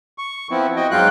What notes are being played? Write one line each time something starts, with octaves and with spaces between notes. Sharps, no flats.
C#6
F3 B3 C4 E4
F#4 D#5 G5
G#2 F#3 G#3 F4 G5 F#6